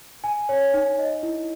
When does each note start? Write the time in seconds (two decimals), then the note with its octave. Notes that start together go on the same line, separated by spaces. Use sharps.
0.24 G#5
0.49 C#5
0.74 D#4
0.99 D#5
1.23 E4